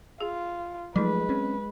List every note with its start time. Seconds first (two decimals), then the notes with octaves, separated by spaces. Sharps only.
0.20 F4 G#4
0.96 F3 F#3 G#3 A3 D#4 B4
1.29 C4 C#4